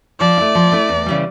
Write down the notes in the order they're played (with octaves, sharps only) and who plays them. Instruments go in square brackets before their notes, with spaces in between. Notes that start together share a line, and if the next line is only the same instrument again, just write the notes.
[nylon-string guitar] F3 [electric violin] D5
[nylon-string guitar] A3 E4
F3
A3 E4
E2
C#3 E3 G3